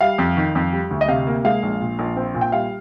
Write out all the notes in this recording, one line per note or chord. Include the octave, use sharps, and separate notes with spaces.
G3 F5
F2
D#3
F2
G3
D2
D#5
C3 F5
A#3
G#3 F5
A#1
A#2
A#1
C4
A#2
G5
G3 F5